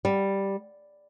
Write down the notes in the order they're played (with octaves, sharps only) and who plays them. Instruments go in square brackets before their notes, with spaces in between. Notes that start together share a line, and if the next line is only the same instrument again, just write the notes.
[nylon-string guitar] G3